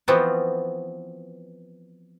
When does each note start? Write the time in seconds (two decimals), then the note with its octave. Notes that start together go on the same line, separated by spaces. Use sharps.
0.08 E3 F3 B3 C4 F4 F#4